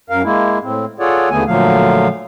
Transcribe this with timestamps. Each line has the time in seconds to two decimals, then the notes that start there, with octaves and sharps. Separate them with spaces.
0.10 F#2 A#4 F5
0.24 G#3 A#3 E4
0.63 A2 C4
1.00 F4 G#4 A4 C#5 D5 F#5
1.30 D#2 D3 A3 B3 G#4 G#5
1.47 A#2 D3 F3 F#3 A3 F5